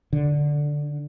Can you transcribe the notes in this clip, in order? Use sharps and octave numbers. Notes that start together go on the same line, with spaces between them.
D3